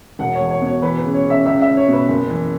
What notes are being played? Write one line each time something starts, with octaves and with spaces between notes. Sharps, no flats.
E1 F#5
C#5
E2
C#5
B2 C#5
E3 B4
B4
C#3
C#5
C#3
E5
C#2 E5
E5
C#2
C#5
B2
B4
F#1
E3